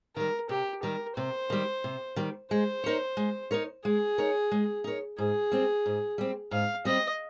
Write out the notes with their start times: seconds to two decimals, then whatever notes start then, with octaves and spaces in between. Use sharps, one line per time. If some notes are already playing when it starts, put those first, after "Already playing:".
0.16 D#3 G3 A#4
0.49 C3 G4
0.83 D#3 G3 A#4
1.16 C3 C5
1.50 D#3 G3
1.84 C3
2.16 D#3 G3
2.51 G#3 C5
2.84 D#4 A#4 C#5
3.17 G#3
3.51 D#4 A#4 C#5
3.84 G#3 G#4
4.18 D#4 A#4 C#5
4.51 G#3
4.84 D#4 A#4 C#5
5.18 G#2 G#4
5.52 G3 C4
5.86 G#2
6.18 G3 C4
6.51 G#2 F5
6.85 G3 C4 D#5